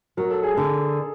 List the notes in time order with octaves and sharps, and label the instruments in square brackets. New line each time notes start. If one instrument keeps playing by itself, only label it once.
[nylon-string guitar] F#3 [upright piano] A#4
[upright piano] A4
G#4
[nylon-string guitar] D3 [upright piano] A4